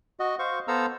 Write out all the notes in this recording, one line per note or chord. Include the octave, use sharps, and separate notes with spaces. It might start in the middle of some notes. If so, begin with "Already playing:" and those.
F#4 D#5
C5 F5 C#6
B3 A4 C5 F5 A#5 E6